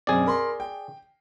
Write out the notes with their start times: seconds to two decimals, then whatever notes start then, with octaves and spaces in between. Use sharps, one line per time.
0.07 F#2 B2 C4 G#4 D5
0.26 A#4 B5 C6
0.60 G5